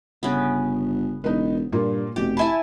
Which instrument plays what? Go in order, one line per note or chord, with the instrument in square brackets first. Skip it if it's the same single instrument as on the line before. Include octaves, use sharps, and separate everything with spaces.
[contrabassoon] G1 [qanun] C#3 B3
[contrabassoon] E1 [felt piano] D#4 B4
[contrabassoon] G2 [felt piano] A#2 A#3 F4
[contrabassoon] F1 [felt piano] B2 [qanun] G4
[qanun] E4 G#5 A5 [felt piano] E5 B5